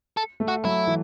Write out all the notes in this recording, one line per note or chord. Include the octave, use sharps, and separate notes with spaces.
A4
A3
F#4
F#3 E4
E3